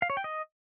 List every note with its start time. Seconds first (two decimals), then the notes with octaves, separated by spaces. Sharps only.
0.02 F5
0.10 C#5
0.17 G5
0.24 D#5